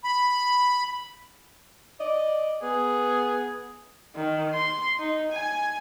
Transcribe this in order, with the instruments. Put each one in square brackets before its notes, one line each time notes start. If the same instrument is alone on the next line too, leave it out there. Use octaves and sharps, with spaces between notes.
[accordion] B5
[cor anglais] D5 [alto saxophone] D#5
[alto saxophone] B3 [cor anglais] G#4
[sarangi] D#3
C6
D#4
G#5